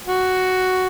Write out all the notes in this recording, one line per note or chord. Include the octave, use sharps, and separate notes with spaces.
F#4